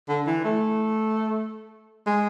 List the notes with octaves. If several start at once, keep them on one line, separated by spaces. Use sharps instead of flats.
D3
E3
A3
G#3